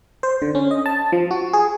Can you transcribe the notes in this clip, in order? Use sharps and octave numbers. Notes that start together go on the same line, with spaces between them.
C5
D3
C#4
D#5
A5
F3
F#4
G#4